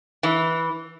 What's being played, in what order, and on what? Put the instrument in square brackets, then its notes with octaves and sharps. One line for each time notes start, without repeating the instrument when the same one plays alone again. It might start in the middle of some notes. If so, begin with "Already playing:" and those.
[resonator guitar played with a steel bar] E3